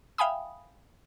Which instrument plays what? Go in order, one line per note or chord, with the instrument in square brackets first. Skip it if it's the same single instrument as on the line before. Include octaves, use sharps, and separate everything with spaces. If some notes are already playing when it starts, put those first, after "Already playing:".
[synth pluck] E5 F5 G5 G#5 B5 D#6